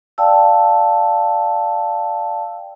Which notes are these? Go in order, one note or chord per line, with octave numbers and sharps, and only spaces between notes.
D5 F5 G5 A5 E6